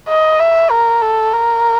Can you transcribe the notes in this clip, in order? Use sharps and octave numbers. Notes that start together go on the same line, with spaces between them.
D#5
E5
A#4
A4
A#4